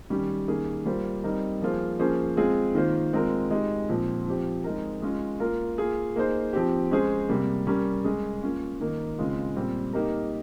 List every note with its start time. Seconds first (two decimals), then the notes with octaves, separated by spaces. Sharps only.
0.10 D#3 G3 C#4 G4
0.48 D#3 A#3 C#4 G#4
0.86 G3 A#3 F4 C5
1.24 G3 C4 D#4 A#4
1.62 F3 A#3 F4 G#4 C5
1.99 F3 A#3 C#4 G#4 C5
2.37 G#3 C4 F4 G#4
2.75 D#3 A#3 F4 C5
3.13 G#3 C4 F4 A#4
3.50 G#3 D#4 G4
3.89 A#2 F3 C4
4.26 F3 C4 G4 C5
4.64 G#3 C4 D#4 A#4
5.02 G#3 C#4 F4
5.40 A#3 F4 A#4
5.78 A#3 F4 G#4
6.16 A#3 D#4 G#4 C5
6.53 F3 C4 G4
6.91 G#3 C#4 G#4 C5
7.28 C3 G3 A#3
7.67 G3 C#4 G4 A#4
8.04 G#3 C#4 G#4
8.43 A#3 C#4 F4
8.81 D#3 A#3 D#4 A#4
9.18 C#3 G#3 C4 F4
9.56 A#2 G3 C4
9.93 A#3 D#4 G4 A#4